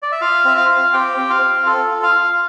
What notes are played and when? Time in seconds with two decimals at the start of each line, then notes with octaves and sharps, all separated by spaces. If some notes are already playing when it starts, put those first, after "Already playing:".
0.02 D5
0.12 E5
0.21 F4 F5
0.45 C4 E5
0.57 F4 F5
0.69 F4
0.93 C4 G4 G5
1.18 C4
1.30 F4 F5
1.42 C4
1.66 F4 A4
1.90 F4
2.02 F4 F5
2.15 F4